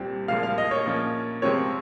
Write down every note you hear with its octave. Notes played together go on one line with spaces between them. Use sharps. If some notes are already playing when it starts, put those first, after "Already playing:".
Already playing: C2 A#2 G3 C4
C2 A#2 F3 G#3 F5
F5
D#5
C#5
A#2 F3 A#3 C#4
C3 F3 G#3 C4 C#5